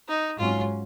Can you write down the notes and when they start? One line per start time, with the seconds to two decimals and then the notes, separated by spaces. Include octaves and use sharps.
0.08 D#4
0.39 G#2 F#3 C#4 F4